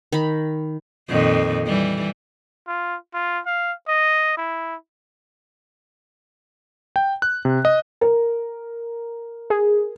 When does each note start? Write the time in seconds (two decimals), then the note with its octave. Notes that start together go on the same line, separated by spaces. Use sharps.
0.12 D#3 B5
1.09 F2 A#2 D#3
1.66 E3 G3
2.68 F4
3.14 F4
3.46 F5
3.88 D#5
4.37 E4
6.96 G5
7.22 F#6
7.45 C3
7.65 D#5
8.01 A#4
9.50 G#4